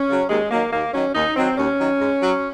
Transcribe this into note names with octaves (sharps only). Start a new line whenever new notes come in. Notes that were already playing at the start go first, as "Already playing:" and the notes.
Already playing: C#4
C#3 F#3
D#2 G#3
D#3 F#3 A#3
D#2 A#3
D#3 F#3 C#4
D#2 D#4
D#3 F#3 C4
D#2 C#4
D#3 F#3
G#2
F#3